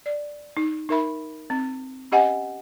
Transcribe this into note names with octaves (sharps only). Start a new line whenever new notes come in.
D5
D#4
D#4 A#4 E5 B5
C4
C#4 G4 D#5 F#5 G#5